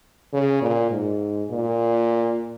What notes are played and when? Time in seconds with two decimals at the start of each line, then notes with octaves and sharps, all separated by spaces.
0.33 C#3
0.62 A#2
0.91 G#2
1.51 A#2